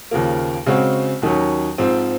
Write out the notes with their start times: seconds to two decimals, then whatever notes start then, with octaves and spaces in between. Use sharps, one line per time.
0.11 D#2 C#3 F3 A#3
0.66 C#3 G#3 C4 F#4
1.22 D#2 D#3 F#3 C#4
1.78 G#2 F3 C4